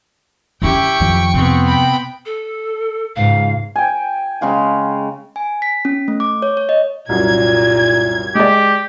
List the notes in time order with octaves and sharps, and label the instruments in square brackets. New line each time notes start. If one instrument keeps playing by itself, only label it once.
[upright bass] F#2 D3 [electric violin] E4 G4 [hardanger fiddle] G5 C#6
[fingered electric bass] F2 [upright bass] D#3 F#3
[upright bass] C3 [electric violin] B3 C4
[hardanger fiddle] G5 B5
[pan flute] A4
[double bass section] C#2 G#2 [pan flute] F5
[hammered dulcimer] G5 G#5
C#3 G#3 F5 G5
[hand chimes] G#5
B6
C#4
A3
D6
C#5
C#5
D#5
[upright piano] C2 F#2 [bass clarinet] A#2 [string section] G#6
[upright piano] G#3 D5 [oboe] G4